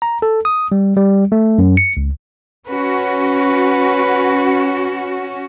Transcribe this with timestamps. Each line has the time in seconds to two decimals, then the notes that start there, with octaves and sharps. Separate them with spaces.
0.02 A#5
0.22 A4
0.45 D#6
0.72 G3
0.96 G3
1.32 A3
1.58 F#2
1.77 C#7
1.97 C#2
2.67 C#4 F#4 B4